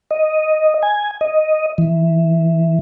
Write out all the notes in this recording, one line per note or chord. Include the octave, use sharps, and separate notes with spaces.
D#5
G#5
D#5
E3